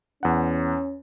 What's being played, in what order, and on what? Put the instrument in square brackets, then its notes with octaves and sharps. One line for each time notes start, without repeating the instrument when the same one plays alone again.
[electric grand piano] E2 F#5 [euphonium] C#4